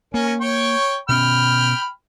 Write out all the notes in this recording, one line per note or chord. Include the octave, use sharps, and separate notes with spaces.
A#3 C#4 A#4 C#5
C#5 G5 C#6
B2 C#4 G5 B5 F6